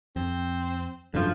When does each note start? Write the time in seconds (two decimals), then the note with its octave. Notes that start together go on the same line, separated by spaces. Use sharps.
0.16 F2 C4
1.14 F1 G2 F3 F#3 A3 C#4